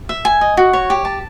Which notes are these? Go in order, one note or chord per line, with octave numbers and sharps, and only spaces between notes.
E5
G#5
D#5
F#4
C#5
G4
A5